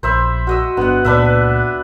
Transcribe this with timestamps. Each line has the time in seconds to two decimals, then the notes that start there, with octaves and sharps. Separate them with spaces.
0.03 A#1 C5 E5 B5
0.47 F#4 D#5 E6
0.77 G1 B3 D4 F#5
1.05 C#2 A#2 D4 B4 E5